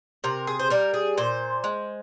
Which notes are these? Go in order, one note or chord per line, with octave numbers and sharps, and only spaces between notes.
C3 A#4
G#4
C5
G3 A#4
G#4
A#2 C5
G#3